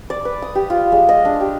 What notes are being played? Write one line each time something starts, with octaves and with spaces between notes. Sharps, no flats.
D5
B4
D#6
G4
F4
G#3
D#5
D4
G4